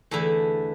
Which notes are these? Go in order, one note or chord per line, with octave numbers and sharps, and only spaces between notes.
E2 D3 A3 E4 A4